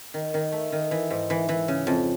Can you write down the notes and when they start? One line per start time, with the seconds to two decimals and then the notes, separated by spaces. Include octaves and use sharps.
0.14 D#3
0.34 D#3
0.52 A3
0.72 D#3
0.91 E3
1.10 G#2
1.30 E3
1.49 E3
1.68 C#3
1.87 F2